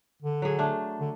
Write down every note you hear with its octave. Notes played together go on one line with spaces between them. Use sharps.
D3
F#3 G#4
A3 D4
D3